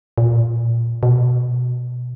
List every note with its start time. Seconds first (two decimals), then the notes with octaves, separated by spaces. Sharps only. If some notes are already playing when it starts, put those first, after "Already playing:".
0.18 A#2
1.03 B2